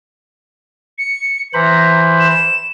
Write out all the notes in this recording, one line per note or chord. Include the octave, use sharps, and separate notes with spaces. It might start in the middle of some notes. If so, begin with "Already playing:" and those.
C#7
E3 C5 A#5 B5
E7